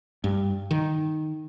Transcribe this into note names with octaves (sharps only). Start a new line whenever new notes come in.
G2
D#3